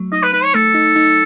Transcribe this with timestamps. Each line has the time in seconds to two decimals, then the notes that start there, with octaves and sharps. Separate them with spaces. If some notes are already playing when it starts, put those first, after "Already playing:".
Already playing: F#3 A3
0.12 D#4 D#5
0.23 B4
0.33 D#4 B4
0.44 C#5
0.55 A3 A4
0.74 D#4
0.96 D#4